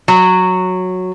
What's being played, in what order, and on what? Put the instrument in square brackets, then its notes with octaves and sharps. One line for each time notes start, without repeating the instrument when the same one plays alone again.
[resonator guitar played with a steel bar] F#3